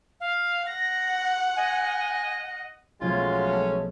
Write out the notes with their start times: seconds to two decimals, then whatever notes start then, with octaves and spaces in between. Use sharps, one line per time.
0.20 F5
0.66 F#5 A#6
1.57 D#5 G#5
3.01 B1 F3 F#3 G#3 A3 C#4 F4 G#6
3.52 A4